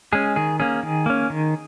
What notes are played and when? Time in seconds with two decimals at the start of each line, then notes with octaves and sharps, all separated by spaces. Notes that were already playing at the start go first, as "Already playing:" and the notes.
0.13 G#3 C#4 G#4
0.36 D#3 G#4
0.60 A#3 C#4 G#4
0.83 D#3
1.06 A#3 C#4
1.30 D#3